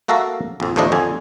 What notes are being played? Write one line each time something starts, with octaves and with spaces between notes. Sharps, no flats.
A#3 F#4 A4 E5 F5 A#5
A#1 F2
D#2 A2 F3 A3 D4 D#5
F2 D3 G#5